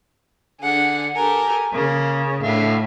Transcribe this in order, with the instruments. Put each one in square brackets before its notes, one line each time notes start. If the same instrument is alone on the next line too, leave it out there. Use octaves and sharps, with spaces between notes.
[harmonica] D3 [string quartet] G#4 F#5
[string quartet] G4 A4 A#4 [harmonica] G#5
[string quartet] C#3 [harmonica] A#3
[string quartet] A2 [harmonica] D3 E5 F5